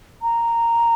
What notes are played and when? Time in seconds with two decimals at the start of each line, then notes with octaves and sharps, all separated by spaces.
0.22 A#5